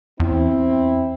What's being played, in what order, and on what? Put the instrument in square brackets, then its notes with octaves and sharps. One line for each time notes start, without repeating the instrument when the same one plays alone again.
[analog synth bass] E2 [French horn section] C4 E4